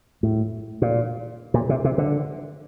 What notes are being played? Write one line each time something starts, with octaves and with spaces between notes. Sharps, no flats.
A2
A#2
A#2
C3
C3
D3